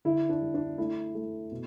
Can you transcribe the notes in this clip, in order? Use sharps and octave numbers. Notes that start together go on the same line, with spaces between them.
D3 E4
D4
G3
D4
A3 E4
A3
B2